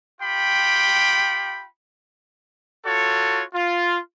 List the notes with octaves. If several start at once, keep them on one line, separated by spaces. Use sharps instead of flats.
F4 G4 G5 B5
F4 F#4 A4 C#5
F4